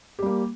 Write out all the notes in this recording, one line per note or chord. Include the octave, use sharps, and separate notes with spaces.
G3 A#3 G4